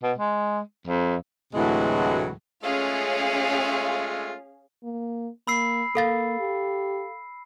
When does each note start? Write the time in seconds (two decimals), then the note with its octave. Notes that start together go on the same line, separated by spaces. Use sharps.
0.03 B2
0.18 G#3
0.87 F2
1.53 D2 A2 C3 E3 F#3 G#3
2.63 G#3 A3 C#4 F4 G#4 F5
4.83 A#3
5.47 A#3 B5 E6 C7
5.95 A#3 A4 F5 A6
6.39 G4